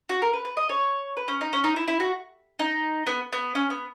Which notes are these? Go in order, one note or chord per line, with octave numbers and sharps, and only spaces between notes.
F#4
A#4
B4
B4
D#5
C#5
B4
C#4
D#4
C#4
D#4
E4
E4
F#4
D#4
B3
B3
C#4
B3